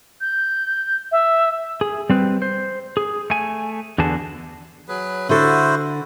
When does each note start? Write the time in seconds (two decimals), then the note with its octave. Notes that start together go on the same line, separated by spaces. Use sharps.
0.21 G6
1.12 E5
1.81 G#4
2.10 G3 C4 B4
2.42 C5
2.97 G#4
3.30 A3 G#5
3.98 E2 D3 F#4 G#4 A5
4.88 F#3 G#4 B4
5.29 D3 E4 F#4 A4 C5